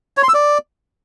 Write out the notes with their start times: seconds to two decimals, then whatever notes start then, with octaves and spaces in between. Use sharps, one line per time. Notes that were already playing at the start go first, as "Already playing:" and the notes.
0.17 C#5
0.23 C6
0.29 E6
0.34 D5